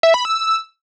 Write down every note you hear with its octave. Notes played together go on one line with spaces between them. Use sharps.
E5
B5
E6